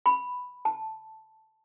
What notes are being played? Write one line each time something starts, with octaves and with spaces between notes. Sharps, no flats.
B5
A5